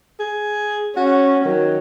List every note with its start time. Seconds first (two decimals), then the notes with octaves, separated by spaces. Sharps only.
0.19 G#4
0.97 C#4 F#4
1.45 D#3 F#3